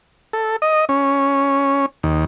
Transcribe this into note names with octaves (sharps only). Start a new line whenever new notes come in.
A4
D#5
C#4
D#2